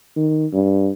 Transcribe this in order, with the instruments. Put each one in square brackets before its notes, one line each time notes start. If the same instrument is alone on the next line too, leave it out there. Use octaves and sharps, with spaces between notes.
[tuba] D#3
G2